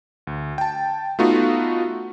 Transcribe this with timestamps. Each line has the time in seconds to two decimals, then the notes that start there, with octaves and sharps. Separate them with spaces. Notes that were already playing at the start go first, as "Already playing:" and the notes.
0.27 D2
0.58 G5 A5
1.19 A3 B3 D#4 F4 F#4